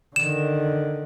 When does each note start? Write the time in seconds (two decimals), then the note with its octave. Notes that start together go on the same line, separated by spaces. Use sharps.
0.16 D3 D#3 E7